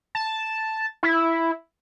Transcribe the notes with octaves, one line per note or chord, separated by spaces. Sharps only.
A5
E4